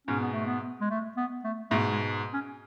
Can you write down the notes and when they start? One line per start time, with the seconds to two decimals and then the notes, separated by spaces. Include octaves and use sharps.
0.07 G#2 B2 C#4
0.20 B3
0.33 A3
0.45 B3
0.81 G#3
0.90 A3
1.17 B3
1.44 A3
1.71 G#2 B2 A3
1.92 G#3
2.33 C#4